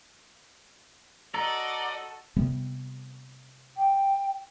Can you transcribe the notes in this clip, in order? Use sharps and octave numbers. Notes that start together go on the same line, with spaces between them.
F#4 A4 D5 D#5 A#5
C3 G3 B3
G5